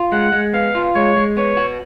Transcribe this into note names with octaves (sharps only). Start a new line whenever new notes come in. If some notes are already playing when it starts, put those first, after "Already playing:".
Already playing: F4
G#3 F#5
G#3
B3 F5
F4
G#3 C#5
G#3
B3 C#5
F#4